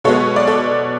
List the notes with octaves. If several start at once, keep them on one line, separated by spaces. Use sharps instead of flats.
B2 G#3 B3 A4 C#5
D5
A4 C#5